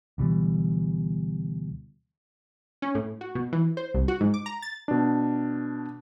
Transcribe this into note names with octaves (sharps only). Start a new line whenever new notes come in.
D2 B2 E3 G3
C#4
A2
F#4
B2
E3
C5
C2
F#4
G#2
D6
A#5
A6
B2 D4